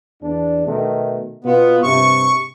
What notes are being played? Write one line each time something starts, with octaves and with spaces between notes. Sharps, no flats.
E2 D4
B2 D#3 A3
B2 B3 F4
G2 C3 C#6